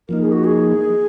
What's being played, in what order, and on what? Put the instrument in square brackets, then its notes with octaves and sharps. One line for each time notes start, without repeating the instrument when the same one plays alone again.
[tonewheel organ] F3 A#3 D#4 [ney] A#4
[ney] G#4
F#4
G#4